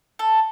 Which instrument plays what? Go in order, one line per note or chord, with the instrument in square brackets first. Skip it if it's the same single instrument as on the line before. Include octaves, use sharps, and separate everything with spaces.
[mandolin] A4